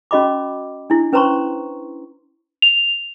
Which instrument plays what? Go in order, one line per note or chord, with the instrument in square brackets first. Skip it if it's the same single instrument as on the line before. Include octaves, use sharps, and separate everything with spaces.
[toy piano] C#4 F#4 D#5 B5 D6
D4 E4
C#4 B4 C5 A#5 C6 C#6
[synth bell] F7